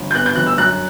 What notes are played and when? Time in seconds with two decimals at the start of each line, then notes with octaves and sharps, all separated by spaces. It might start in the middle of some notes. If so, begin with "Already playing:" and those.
Already playing: G1
0.11 G6
0.14 B3 F#6
0.26 G6
0.35 G1 F#6
0.47 E6
0.58 F#2 F#6